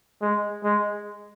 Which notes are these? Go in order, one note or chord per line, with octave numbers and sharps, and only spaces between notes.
G#3
G#3